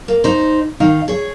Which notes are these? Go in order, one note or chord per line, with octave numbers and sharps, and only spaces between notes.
A#3
D#4 C5
D#3 D#4 F5
G#4 C#5